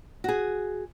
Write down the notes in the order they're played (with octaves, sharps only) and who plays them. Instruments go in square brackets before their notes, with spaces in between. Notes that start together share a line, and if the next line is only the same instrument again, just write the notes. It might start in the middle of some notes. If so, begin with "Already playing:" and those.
[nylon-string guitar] F#4 G#4